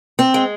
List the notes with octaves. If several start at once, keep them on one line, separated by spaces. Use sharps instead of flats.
C4
G#3